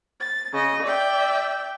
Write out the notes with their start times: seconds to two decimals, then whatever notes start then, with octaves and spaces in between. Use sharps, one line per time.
0.19 A6
0.52 C#3 D#5
0.83 D5 E5 G5